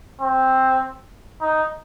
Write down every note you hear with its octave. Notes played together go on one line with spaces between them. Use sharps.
C4
D#4